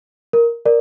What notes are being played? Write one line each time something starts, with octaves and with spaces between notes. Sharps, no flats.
A#4
A#4 D5